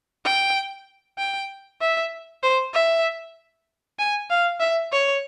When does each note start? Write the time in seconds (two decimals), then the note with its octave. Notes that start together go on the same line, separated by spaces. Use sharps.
0.25 G5
1.18 G5
1.81 E5
2.43 C5
2.74 E5
3.99 G#5
4.30 F5
4.60 E5
4.92 C#5